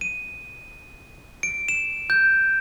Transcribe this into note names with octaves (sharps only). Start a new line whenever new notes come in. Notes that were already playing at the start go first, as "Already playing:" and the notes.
D#7
D7
E7
G6